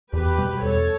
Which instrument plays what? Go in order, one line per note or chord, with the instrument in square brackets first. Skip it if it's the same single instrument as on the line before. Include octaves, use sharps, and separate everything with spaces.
[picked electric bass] E2 [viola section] G4 B4
[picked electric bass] B2 G3
[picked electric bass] E2 [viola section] A4 C#5